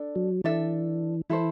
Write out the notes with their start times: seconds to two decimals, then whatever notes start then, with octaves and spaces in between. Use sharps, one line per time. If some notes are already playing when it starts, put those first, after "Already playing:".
Already playing: D4 A4
0.16 F#3
0.44 E3 D4 A4 E5
1.30 E3 E4 A4 C5